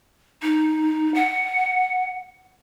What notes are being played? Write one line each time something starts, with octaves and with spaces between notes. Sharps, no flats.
D#4
F#5